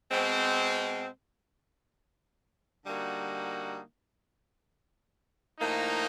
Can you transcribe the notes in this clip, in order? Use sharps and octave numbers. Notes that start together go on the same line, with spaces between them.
B2 G#3 C4
D3 G3 A#3 D#4 F#4
A2 F3 A#3 D#4